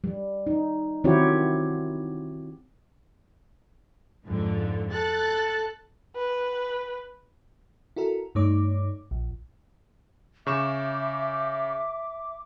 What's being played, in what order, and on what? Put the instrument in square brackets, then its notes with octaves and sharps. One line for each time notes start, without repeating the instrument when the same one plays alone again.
[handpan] G3
D#4
D#3 C4 E4 F#4 G4 C#5
[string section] F2 G#2 D3
[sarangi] A4 [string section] F#6 A6
[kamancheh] B4
[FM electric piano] E4 F#4 A4 A#4
G2 A3 D#4 C#5 D6
A#1
[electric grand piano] C#3 C#6 E7 [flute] E5 [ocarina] D6